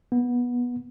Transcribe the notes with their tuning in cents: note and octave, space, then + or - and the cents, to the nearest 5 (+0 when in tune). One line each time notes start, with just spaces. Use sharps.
B3 -15